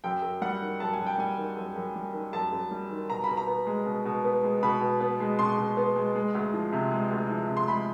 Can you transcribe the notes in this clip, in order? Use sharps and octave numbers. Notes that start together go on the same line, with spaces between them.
F#2 G5
F#2
G3 F#5
D#3
F#2 A5
G#5
F#2
G5
G3 G#5
D#3
F#2
F#2
G3
D#3
F#2 A5
F#2
G3
D#3
B2 A#5
B5
B2
A#5
B3
G#3
B2
B2
B3
G#3
B2 B5
B2
B3
G#3
B2 C6
B2
B3
G#3
G#3
D2
F3
C3
G#3
D2
F3
C3
C6
G#3 B5